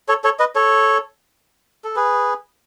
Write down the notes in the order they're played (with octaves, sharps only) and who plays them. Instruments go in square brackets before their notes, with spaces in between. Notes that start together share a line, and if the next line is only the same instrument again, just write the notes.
[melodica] A4 C#5
A4 C#5
B4 D#5
A4 C#5
A4
G#4 B4